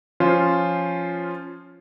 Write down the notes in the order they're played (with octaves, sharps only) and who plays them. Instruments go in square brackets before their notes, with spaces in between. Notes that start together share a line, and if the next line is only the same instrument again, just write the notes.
[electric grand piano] F3 C#4 F4 C5